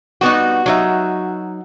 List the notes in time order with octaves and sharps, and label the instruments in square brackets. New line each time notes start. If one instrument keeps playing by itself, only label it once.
[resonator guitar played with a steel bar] G3 B3 D#4 [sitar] F#4
[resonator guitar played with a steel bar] F#3 D#4 E5